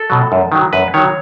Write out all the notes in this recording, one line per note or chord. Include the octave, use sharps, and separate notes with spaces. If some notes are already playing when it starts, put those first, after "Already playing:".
Already playing: A4
B2 F#3
F#2
D#3 F#3
F#2 B4
D#3 F#3 C#5